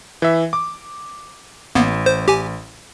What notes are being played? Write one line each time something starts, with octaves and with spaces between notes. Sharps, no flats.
E3 E5
D6
A1 A#3 B3
C5
G4 G#5